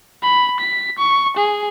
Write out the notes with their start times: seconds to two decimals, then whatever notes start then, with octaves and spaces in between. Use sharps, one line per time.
0.23 B5
0.60 B6
0.98 C#6
1.37 G#4